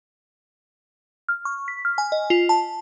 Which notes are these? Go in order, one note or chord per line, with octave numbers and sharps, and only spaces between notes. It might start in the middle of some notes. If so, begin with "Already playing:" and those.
F6
C#6
B6
F6
G#5
D#5
F4
A5